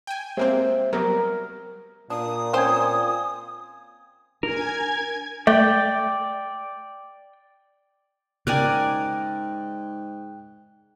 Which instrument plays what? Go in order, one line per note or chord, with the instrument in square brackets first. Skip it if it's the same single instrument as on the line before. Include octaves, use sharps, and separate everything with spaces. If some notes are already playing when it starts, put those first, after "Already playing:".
[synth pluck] G5 G#5
[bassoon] C3 [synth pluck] G#3 A#3 C4
[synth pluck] F#3 G3 B3 [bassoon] A#4
[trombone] A#2 [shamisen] D4 [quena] D#6
[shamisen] C4 C#4 C5 [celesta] G5 G#5 G#6
[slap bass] D4 [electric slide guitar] A#4 [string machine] G#5 G#6
[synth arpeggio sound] A3 [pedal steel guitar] D5 G5
[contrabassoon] G#2 [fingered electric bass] C#3 [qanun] A#4 D5 G#5 [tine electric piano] G5 F#6